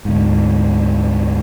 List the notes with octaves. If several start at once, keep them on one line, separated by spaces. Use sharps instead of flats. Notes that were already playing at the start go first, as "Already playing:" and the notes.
D2 G#2